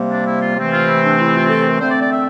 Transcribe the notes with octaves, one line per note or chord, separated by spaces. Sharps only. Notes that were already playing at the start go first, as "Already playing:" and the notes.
Already playing: C3 G3 A#3
D4
E4
F4
C3 E3 A3 C4
F4
E4
D4
E4
F4
A4
A#4
D3 A3 C4 C5
D5
D5
E5